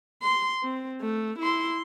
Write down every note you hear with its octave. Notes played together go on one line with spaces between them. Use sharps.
C6
C4
A3
E4 C6